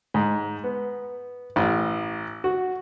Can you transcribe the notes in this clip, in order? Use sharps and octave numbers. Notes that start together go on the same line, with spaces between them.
G#2
B3
A1
F#4